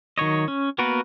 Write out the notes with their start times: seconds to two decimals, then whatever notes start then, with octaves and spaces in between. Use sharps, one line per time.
0.18 D#3 F#3 C#5 D#5
0.48 C#4
0.78 A#3 B3 F#4 A#4 B4